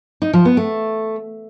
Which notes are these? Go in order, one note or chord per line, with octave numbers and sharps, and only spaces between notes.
D#4
F3
B3
A3